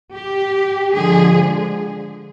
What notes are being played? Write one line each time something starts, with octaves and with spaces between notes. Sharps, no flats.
G4
D3 F3 G#3 G#4